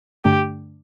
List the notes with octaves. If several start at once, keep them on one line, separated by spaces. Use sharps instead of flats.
G2 D3 A3 D4 G4